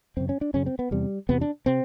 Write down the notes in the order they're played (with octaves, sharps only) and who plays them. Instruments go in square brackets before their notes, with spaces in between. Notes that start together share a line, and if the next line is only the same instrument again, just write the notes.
[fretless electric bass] F#2 C#3 C4
C#4
D4
F#2 C#3 C#4
C4
B3
E2 C3 G3
E2 C3 B3
D4
C3 C4